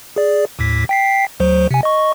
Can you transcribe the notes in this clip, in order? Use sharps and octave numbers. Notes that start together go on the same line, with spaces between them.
G#4 D5
D#2 A2 B6
G5 B6 C7
D2 F#3 C5
C3 G#5
D#5 C#6